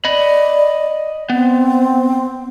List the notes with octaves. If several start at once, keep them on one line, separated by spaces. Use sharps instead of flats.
D5 D#5 B5
B3 C4